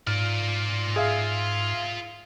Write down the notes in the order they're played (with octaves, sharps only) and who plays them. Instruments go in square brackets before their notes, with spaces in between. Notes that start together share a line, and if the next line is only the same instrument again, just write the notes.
[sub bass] G#2 [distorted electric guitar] F4 D5 [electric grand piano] F6
[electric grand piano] G#4 E5 F5